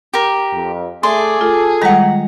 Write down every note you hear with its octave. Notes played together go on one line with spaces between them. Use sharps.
G4 A#4
F2
A3 G#4 A4 D5 C6
F4 A4
D#3 G3 G#3 F#5 A#5